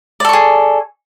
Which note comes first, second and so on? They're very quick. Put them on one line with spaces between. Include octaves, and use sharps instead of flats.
D5 A4 C#6 G#4